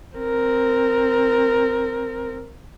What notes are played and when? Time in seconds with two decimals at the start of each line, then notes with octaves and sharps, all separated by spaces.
0.16 C4 A#4